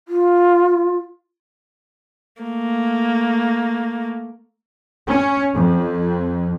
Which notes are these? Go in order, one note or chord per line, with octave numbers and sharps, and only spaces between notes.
F4
A3 A#3
C#4
F2